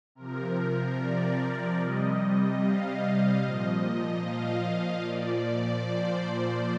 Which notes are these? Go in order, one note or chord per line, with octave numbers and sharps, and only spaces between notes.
C3 F3 A#4
D5
C3 G3 D#5
F5
A#2 F3 D#5
F5
A#2 F3 D5
C5